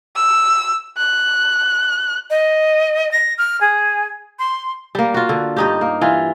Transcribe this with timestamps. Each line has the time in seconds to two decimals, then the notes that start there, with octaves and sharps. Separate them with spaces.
0.16 E6
0.97 F#6
2.30 D#5
3.11 A#6
3.38 F6
3.60 G#4
4.39 C6
4.95 G3 A#3
5.14 F4 F#4
5.29 D3
5.56 G2 D#4 G4
5.81 A#3
6.01 E3 F4